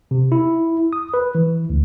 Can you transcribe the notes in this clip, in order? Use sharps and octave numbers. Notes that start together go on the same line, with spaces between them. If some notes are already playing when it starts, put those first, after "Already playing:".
C3
E4
D#6
B4
E3
D2